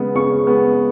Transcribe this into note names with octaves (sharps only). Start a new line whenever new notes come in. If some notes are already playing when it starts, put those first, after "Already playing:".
Already playing: C#3 G#3 B3
C#3 C#6
G#3 B3